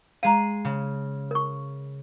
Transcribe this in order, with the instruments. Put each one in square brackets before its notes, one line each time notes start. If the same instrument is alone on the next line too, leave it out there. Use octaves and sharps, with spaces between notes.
[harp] G#3 C7 D#7 [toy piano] F5 A#5
[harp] C#3
[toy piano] A#4 C#6